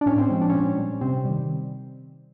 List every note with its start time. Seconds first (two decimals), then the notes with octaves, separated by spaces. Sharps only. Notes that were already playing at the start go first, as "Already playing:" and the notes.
0.01 D4
0.06 A2 C#4
0.18 C4
0.30 F3 G#3 C4
0.42 D4
0.50 C#4
0.54 A#2 C4
0.78 G3
1.01 C3 C4
1.25 D#3 G3